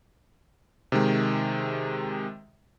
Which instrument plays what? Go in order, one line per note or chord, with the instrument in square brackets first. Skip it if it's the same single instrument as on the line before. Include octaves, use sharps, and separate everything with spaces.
[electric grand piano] C3 D#3 G#3